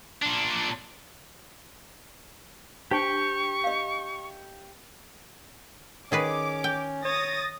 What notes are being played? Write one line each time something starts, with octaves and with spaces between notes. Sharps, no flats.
A#2 D4
D4 G4 C5 G5 A5 C#6
D#5 F5
D#3 C#4 G#4 B4 D6
G5
C#5 D#6 A6 A#6